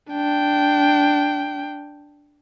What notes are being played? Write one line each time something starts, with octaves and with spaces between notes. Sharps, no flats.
D4 G5